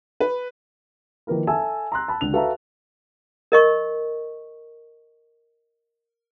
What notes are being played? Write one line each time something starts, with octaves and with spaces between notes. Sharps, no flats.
B4
D#3 F3 A#3 E4 A#4 B4
A4 E5 G#5 A5 E6
A#5 C6 F#6
A5 B5
C#2 D3 F7
F#4 A4 B4 E5 F5 A#5
A#4 D#5 C#6